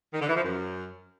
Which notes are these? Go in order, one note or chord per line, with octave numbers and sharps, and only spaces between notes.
D#3
D3
E3
F3
F#2